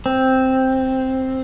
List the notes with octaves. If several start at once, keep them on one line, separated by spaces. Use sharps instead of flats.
C4